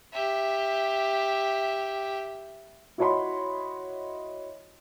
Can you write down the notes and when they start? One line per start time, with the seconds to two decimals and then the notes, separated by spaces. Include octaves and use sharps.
0.13 G4 E5
2.98 E4 F#4 C#5 D#5 B5 C6